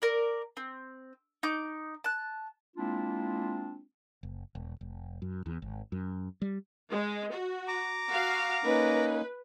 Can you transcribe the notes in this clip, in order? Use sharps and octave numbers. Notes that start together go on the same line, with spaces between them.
A#4 D5
C4
D#4 D6 G6
A5 F#6
G#3 A#3 C4 D4 E4 F4
F#1
E1
F1
F#2
E2
G#1
F#2
G3
G#3
F#4
A#5 D6
F#4 F5
A#3 C#4 D#4 B4